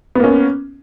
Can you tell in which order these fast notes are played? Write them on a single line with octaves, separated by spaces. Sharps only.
B3 A#3 C#4